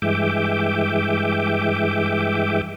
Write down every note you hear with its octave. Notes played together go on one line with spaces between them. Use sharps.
G2 E3 G#3 E5 G5 D6